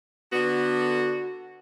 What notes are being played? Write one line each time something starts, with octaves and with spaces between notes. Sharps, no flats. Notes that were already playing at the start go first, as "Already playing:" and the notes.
D3 B3 F#4